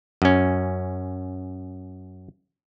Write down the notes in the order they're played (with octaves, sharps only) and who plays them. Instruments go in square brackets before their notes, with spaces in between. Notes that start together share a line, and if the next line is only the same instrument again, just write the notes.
[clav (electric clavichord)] F#2 C#4